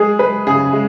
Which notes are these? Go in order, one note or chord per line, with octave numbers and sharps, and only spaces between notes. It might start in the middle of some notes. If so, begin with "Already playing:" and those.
Already playing: G#3 G#4
G#3 B4
C#3 G#4
G#3